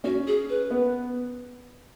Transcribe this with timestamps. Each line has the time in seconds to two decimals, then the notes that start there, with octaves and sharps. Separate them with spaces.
0.04 C#4 F#4
0.27 G#4
0.50 B4
0.70 B3